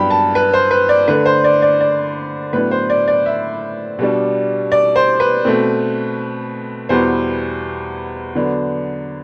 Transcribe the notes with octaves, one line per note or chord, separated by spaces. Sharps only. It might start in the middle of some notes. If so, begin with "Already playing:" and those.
Already playing: G2 F#3 B3 D4 G5 B5
A5
B4
C5
B4
D5
D3 A3 D4 B4
C5
D5
D5
D5
A2 F#3 B3 D4 B4
C5
D5
D5
E5
B2 G3 D4
D5
C5
B4
B2 A3 C4
E2 B2 G3 B3 C5
D3 F#3 B3 D4